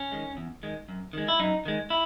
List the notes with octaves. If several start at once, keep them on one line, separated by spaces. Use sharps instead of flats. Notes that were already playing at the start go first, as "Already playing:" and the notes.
Already playing: C#4
D#3 G#3
E2
D#3 G#3
F#2
D#3 G#3
E4
F#2 D#4
D#3 G#3
E4